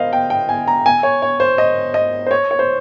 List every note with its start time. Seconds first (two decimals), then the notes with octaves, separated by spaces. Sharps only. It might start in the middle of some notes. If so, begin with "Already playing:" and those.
Already playing: A#4 C5 D#5 F5
0.13 G5
0.30 G5
0.49 G#5
0.67 A#5
0.86 G#5
1.03 C#5
1.22 C#5
1.40 C5
1.58 D#5
1.94 D#5
2.26 C5
2.31 C#5
2.51 C#5
2.59 C5